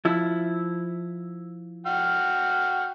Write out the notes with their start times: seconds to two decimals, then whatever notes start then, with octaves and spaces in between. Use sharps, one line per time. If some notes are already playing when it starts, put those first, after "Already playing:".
0.05 F3 E4
1.86 F#4 G5 F6